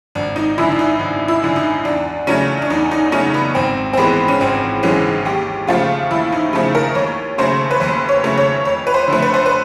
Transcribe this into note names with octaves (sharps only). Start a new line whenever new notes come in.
G#1 D4
D#4
F#2 D3 E4
D4
D#4
G#1
E4
F#2 D3
D#4
E2 D4
C#3 F#3 A3 C#4
D4
E2 D#4
D#4
C#3 F#3 A3 C#4
B3
G#1 C4
C4
G#2 E3 G#3 B3
C#4
G#1 C4
G#2 E3 G#3 C#4
D#2 G4
C#3 F3 A3 F4
D#2 E4
D#4
C#3 F3 A3
A#4
D#2 C#5
C#3 F#3 A3 C5
B4
D#2 C5
C#5
C#3 F#3 A3
C#5
F2 C#5
B4
C5
D3 F3 A3
B4
C5
B4